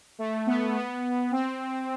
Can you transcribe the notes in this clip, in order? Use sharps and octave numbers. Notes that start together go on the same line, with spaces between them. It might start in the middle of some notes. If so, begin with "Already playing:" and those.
A3
B3
B3
C4